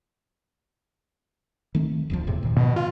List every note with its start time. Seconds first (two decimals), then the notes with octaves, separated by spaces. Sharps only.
1.75 D#3 A3 C4
2.10 F1 D2 F3
2.27 E2 A2 C3
2.43 A#2 D#3 F3
2.57 B2
2.76 F4